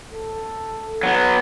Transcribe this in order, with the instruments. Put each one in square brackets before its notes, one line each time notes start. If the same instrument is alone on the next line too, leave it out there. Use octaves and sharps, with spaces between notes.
[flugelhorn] A4
[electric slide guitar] F#3 B3